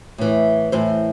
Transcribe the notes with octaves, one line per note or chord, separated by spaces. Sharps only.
A2 E3
A2 E3 C5